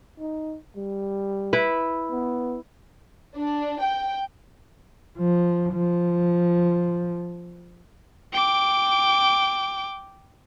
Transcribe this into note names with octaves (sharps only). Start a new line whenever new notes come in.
D#4
G3
E4 B4
B3
D4
G5
F3
F3
G5 D6